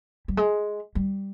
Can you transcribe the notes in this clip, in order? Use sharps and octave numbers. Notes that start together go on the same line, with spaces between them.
G3
G#3
G3